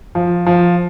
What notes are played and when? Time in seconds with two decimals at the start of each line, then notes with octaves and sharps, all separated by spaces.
0.15 F3
0.46 F3